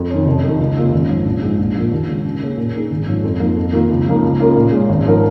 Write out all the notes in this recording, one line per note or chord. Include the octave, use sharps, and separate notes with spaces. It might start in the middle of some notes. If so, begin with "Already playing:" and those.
Already playing: F2
D#3 C#4
F1
F2 D#3
C#2
C#3 A#3 F4
G#1
G#2 F3 C#4
A#1
G#2 F3 G#3
A#1
A#2 F3
D#2
C#3 G#3 F4
C#3
A#3 C#4 G#4
A#2
A#3 D#4 G#4
G#1
G#2 F3 C#4
F2
F3 A#3 D#4
F2
D#3 A#3 F4
C#2
C#3 F3 A#3 D#4
C#2
C#3 A#3 F4 A#4
A#2
G#3 C#4
G#1
G#2 F3 C#4 A#4